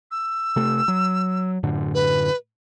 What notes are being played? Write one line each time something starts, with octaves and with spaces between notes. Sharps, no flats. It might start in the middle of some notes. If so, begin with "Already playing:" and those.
E6
C3 A3
F#3
F#2 A2 D3
B4